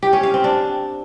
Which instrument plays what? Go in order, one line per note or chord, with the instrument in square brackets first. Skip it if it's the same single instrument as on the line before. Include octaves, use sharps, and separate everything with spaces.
[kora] G4
C#4
F5
C4
D4